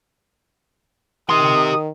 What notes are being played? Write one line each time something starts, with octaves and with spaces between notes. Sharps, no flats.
D#3 G4 C6 D#6